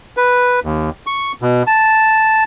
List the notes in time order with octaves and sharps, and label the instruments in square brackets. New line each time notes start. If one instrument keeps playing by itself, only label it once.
[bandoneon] B4
D#2
C#6
B2
A5